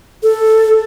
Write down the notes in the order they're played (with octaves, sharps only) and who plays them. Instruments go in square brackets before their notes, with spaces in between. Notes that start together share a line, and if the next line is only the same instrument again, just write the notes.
[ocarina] A4